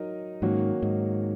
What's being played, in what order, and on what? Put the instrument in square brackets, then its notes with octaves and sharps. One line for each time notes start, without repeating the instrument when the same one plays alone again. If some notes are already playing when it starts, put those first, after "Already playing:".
Already playing: [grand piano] F#3 D#4 A#4 D#5
[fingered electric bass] G#2 [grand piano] D#3 F#3 A#3 C#4 F#4
[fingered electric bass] G#2